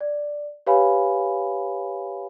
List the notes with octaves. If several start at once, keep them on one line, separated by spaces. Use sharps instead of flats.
D5
G4 B4 C#5 F5 G#5 B5